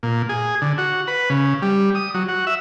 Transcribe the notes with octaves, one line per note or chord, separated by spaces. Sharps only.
A#2
G#4
D3
F#4
B4
C#3
G3
D#6
F#3
F#4
E5